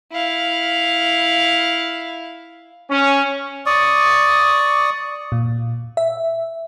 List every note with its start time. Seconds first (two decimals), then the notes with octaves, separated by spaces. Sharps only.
0.12 E4 F5
2.90 C#4
3.66 D5 C#6 D#6
5.32 A#2
5.97 E5